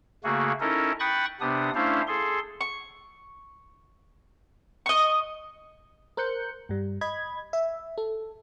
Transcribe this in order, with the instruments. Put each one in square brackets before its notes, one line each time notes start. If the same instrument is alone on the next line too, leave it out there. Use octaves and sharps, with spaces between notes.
[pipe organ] C#3 A3 A#3 F#4 G#4
C#4 D#4 E4 A4 A#4 D#5
G5 B5 C#6 D#6 F#6 A6
C3 B3 D4 G4 D#6
A3 C#4 D4 E4 C5 F5
G#4 A4 C6
[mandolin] C#6
D#5 C#6
[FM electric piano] A#4 C5 F#6 G6 C#7
G2 G3
D#5 B5 G#6
E5
A4